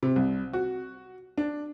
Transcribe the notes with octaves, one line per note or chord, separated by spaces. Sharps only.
C3
C2
F#4
D4